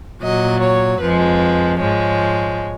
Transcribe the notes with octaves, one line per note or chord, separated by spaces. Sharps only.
A#2 F#3 D#5
C#5
F2 F3 G#3 B4
G#2 F3 G#3 C#5